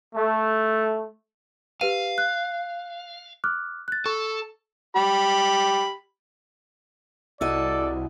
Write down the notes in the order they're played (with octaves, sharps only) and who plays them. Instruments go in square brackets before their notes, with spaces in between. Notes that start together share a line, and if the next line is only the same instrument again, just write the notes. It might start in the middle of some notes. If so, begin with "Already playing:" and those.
[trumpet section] A3
[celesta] G4 B4 D#7 [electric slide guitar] F5
[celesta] F#6
D6 F6 F#6
F#6 A6
[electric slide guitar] A4 [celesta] C#6
[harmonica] G4 B5
[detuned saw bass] C2 [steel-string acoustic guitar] E4 F#4 D#5 [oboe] A4 [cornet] D5